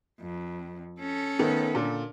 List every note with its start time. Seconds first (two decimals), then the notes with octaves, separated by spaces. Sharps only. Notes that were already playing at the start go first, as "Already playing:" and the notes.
0.20 F2
1.00 C#4 A4
1.39 D#3 A3 B3
1.75 A#2 D3